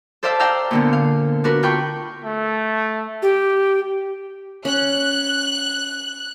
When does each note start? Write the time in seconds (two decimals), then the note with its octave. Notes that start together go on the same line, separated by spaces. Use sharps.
0.23 A4 C5 D5 E5 F5 A5
0.40 D5 F5 G5 A#5 E6
0.71 A#2 D3 B3
0.93 F5
1.44 D4 F#4 A#4 B4
1.63 D4 F4 G5 B5 C#6
2.25 A3
3.22 G4
4.65 C#4 F#6